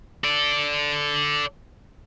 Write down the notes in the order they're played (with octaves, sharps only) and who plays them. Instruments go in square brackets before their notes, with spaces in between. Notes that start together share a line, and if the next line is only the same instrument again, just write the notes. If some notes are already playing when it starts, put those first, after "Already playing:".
[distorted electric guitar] A4 D5